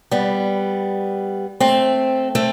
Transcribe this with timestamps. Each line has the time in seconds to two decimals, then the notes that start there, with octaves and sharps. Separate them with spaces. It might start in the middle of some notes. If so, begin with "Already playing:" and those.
0.11 G3 B3
1.60 A3 C4
2.35 A3 C4